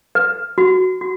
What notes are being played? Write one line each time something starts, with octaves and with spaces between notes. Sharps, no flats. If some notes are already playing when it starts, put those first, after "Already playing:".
B4
F#4
F#4